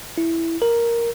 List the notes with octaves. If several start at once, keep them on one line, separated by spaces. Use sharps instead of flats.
E4
A#4